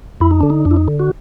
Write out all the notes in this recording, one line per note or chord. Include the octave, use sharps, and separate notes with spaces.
F2 E4
D#4
D3 D4
D#4
F2 D4
E4
D#4
D3
F#4